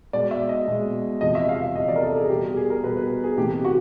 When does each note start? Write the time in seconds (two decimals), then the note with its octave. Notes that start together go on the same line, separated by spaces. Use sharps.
0.13 B2 G#3 D5
0.31 E5
0.49 D#5
0.67 B2 G#3
1.21 E2 C3 F3 D#5
1.35 E5
1.49 F5
1.62 E5
1.75 E2 C3 F3 D#5
1.88 D5
1.96 A#4
2.03 A4
2.16 G#4
2.30 B2 G3 G4
2.57 G#4
2.70 A#4
2.84 B2 G3 B4
2.97 B4
3.24 G#4
3.38 C3 E3 A3 G4
3.65 F#4